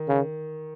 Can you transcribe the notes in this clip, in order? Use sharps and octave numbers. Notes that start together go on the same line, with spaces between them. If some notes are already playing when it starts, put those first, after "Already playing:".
Already playing: D#3
C#3